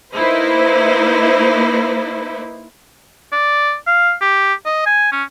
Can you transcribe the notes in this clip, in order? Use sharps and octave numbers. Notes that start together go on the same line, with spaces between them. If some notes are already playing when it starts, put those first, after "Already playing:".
A#3 D#4 E4 B4 C5
D5
F5
G4
D#5
G#5
C#4